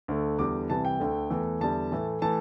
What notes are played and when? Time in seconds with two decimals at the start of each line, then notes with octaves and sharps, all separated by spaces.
0.08 D2 D3 A3
0.39 E2 D3 G3 D6
0.69 C2 C3 E3 G3 A5
0.85 G5
1.00 D2 D3 A3
1.30 E2 E3 A3
1.60 E2 D3 G3 A5
1.92 A2 E3 A3
2.22 E3 A3 A5